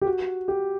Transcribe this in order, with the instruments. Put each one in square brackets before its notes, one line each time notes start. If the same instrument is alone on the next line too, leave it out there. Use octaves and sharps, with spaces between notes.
[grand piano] G4
F#4
G4